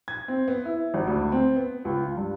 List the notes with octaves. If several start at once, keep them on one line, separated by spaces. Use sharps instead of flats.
G#6
C4
B3
E4
G#1
D2
C4
B3
C#2
F4
G2